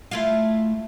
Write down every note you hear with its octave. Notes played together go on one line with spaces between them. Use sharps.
A3 E4 F4